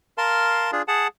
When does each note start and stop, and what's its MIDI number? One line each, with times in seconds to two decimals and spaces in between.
0.18 0.71 70
0.18 0.71 77
0.18 0.71 81
0.18 0.71 84
0.72 0.82 62
0.72 0.82 65
0.72 0.82 68
0.88 1.07 68
0.88 1.07 78
0.88 1.07 81